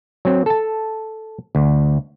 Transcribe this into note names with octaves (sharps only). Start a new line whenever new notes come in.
F#3 C4
A4 A5
D2